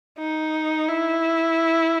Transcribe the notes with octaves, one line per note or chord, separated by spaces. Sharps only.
D#4
E4